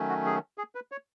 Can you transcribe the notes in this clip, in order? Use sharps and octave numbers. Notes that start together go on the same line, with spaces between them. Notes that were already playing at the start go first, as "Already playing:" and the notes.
Already playing: D#3 F#3 A3 C#4
F#4
G#4
G#4
B4
C#5